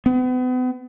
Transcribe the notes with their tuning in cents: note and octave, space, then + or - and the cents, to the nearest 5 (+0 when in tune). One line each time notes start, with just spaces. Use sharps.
B3 +40